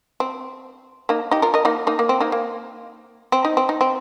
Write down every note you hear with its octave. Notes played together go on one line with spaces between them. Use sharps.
C4
A#3 D#4
D#4 G4
F4 A#4
A#4 D#5
A#3 D#4
A#3 D#4
A#3
C4
A#3 D#4
A#3
C4
D#4
C4
D#4
C4